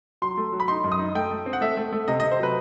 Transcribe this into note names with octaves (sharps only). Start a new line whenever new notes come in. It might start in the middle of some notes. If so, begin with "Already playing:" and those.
F#3 C6
A3
F#3
B5
D#4 C6
F#2
D#6
D#4
A3 G5
A3
C4
F#5
A3 E5
A3
A3
C3 D#5
D#5
C3
C5
F#3 B4